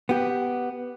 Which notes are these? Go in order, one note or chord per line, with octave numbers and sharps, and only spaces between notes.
B3 G4